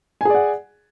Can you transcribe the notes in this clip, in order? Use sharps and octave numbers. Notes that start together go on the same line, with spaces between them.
G#4 D5 F#5 G#5